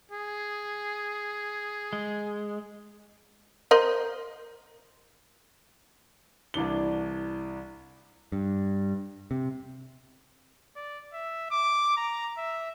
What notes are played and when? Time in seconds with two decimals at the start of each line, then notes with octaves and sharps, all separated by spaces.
0.12 G#4
1.93 G#3
3.71 A#4 C5 D#5
6.54 C2 E3 D4 G7
8.32 G2
9.31 C3
10.76 D5
11.13 E5
11.51 D6
11.97 A#5
12.37 E5